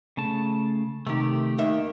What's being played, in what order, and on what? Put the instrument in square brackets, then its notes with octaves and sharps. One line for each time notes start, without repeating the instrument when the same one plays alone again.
[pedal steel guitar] C#3 A3 A5
[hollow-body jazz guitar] C3 D#3 [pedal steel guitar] A3 G4
[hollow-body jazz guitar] D#2 D#3 E5